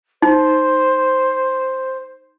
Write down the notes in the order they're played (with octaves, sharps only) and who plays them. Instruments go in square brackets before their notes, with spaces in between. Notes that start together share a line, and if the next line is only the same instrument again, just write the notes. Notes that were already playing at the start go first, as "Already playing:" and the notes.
[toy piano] D#4 [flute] C5